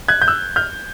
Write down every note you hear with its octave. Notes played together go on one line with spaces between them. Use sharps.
F#6 G#6
G6
E6 F#6
F6 G6